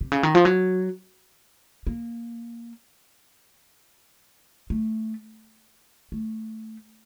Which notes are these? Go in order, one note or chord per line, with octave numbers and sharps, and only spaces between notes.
C3
C#3
D#3
F3
F#3
A#3
A3
A3